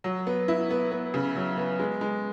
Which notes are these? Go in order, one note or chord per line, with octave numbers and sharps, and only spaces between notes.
F#3
B3
E4
B3
B3
C#3
F#3
B3
G#3
G#3